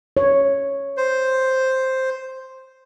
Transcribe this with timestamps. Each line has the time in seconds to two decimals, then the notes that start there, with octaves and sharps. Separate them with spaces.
0.17 C#5
0.97 C5